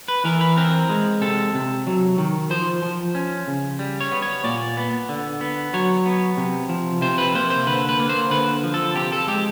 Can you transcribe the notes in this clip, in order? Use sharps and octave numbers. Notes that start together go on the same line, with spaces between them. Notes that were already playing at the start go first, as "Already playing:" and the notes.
B4
E3 A#4
B4
C4 A#4
G#3
C3 A4
C3
F#3
D#3
F3 C5
F3
C#4
C#3
G3
C#5
B3
C#5
A#2 D5
B3
D3
B3
F#3 C#5
B3
C3
F3
C3 C5
B4
A#3 C5
C5
D3 B4
B4
A#3
C5
D3 B4
F3
A4
C3 G4
A4
G#3 G4